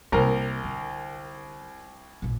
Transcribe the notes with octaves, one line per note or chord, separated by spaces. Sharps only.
C2 C3 A#3 A#4
D3
A1 A#2